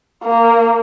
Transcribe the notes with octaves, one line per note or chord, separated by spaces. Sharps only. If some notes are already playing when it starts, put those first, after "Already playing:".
A#3